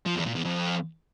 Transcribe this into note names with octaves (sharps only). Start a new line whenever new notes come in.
F3
E2
A#2
E2
F2